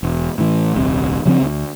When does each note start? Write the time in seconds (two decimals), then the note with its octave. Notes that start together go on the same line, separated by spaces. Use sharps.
0.03 E1
0.38 A2 E3
0.76 D#1 C2 C3
1.26 C#3 F3 A3 C4
1.42 D2